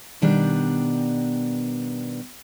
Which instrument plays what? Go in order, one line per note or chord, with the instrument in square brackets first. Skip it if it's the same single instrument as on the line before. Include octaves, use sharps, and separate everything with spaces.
[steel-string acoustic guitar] B2 D#3 G3 B3 D4